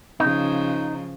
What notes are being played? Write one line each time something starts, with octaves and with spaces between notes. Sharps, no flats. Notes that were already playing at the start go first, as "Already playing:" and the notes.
C#3 F3 D#4